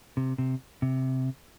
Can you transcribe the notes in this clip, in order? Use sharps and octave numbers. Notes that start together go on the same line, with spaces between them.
C3
C3
C3